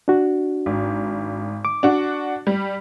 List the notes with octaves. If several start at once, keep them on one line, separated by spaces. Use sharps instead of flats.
D4 F#4
G#1
D6
D4 F#4
G3